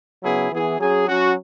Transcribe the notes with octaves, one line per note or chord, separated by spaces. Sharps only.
C#3 F#3 B3 E4 G#4
E3 B3 E4 G#4
F#3 C#4 G#4
F#3 C#4 F#4